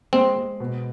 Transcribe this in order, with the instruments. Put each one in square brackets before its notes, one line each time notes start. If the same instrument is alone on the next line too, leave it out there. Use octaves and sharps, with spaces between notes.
[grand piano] G#3 [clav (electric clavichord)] C4
[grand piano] G#3
B2